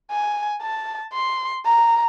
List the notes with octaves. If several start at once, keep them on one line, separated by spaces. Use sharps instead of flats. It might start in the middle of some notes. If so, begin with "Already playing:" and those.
G#5
A5
C6
A#5